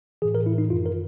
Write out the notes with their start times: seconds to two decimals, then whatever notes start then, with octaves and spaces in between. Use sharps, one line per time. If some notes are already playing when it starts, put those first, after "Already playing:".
0.22 A2 E3 G#4
0.35 A#4
0.46 E4
0.58 D#4
0.70 F#2 D#3 F4
0.86 A#4